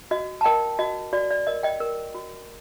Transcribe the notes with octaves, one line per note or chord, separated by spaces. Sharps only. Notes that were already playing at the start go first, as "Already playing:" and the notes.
F#4 D#5
A5
A#4 D#5 G5
F#4 D#5
F#4 D5
D5
A#4 D#5
D#5 G5
A#4
F#4